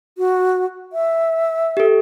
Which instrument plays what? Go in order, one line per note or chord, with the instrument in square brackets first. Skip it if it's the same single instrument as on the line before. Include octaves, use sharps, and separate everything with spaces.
[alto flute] F#4
E5
[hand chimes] G4 A4